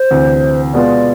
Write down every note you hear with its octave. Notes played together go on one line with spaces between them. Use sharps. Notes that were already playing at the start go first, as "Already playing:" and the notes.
Already playing: C5
D2 C3 E3
B2 G#3 B3 F4 D5